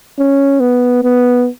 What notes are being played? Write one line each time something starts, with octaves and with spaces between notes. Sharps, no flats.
C#4
B3
B3